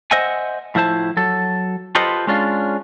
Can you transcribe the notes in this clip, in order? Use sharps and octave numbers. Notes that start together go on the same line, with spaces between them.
C5 D#5 E5 F#5 G#5
A2 F3 E4 C5 A5
F#3 A4
F4 G4 A4 B4 C5 D#5
G#3 C#4 D4 F4